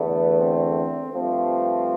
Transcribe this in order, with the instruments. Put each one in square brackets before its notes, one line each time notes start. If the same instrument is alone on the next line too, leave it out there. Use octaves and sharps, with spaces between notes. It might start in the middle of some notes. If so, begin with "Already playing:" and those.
Already playing: [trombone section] E2 D3 A3 B3
C4
G2 F3 A3 C4